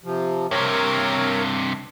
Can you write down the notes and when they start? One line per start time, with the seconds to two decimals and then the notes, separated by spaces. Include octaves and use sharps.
0.04 C3 F3
0.51 G2 C3 A#4 C#5